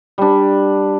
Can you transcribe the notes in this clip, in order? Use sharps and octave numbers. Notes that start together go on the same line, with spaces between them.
G3 D4